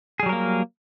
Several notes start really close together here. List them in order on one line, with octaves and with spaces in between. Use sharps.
G#4 G3 F#3 A#4 A#3